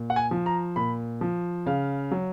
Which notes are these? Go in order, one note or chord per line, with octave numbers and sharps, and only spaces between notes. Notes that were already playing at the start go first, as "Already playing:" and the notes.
Already playing: A#2
F#5
G#5
F3
A#5
A#2 B5
F3
C#3 F5
F#3